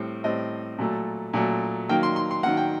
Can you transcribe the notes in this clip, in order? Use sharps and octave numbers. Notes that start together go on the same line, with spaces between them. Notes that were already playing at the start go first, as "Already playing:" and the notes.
Already playing: A2 G3 C4
A2 G3 C4 D#5
A#2 F#3 A3
A#2 F#3 A3
D#3 F#3 A#3 G5
C6
C6
C6
D#3 F#3 A#3 F#5
G5